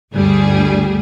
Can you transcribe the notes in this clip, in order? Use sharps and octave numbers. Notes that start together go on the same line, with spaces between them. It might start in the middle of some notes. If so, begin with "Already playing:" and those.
G1 D2 G3 G#4